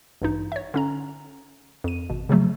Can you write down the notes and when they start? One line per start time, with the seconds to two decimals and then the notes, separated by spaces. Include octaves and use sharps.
0.22 A1 G2 D#4
0.52 C#5 E5
0.74 D3 C#4 A#5
1.84 F2 D#7
2.09 G#1 B2
2.29 C#3 F3 F#3 A3